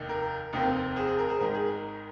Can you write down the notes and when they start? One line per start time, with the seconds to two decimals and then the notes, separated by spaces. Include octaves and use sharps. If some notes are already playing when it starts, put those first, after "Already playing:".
Already playing: F1 D#2 D#3
0.09 A#4
0.53 F1 D#2 D#3 C4
0.96 G#4 C5
1.07 G#4
1.18 A#4
1.29 G#4 C5
1.40 G#1 G#2 D#3 A#4
1.54 G#4
1.70 A#4